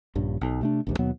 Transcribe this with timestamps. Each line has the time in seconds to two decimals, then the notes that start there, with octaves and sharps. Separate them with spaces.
0.15 A#1 G2 C#3
0.41 B1
0.61 C3 A3 D4
0.87 A#1 D#2 G#2
0.99 D#2 B2 F#3 B3